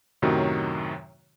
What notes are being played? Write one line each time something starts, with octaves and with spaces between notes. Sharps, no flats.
F#2 A2 C3 D#3 F#3 F#4